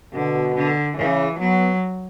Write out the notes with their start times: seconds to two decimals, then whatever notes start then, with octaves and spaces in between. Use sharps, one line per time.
0.13 B2 D3
0.55 D3
0.97 C#3 E3
1.39 F#3 B3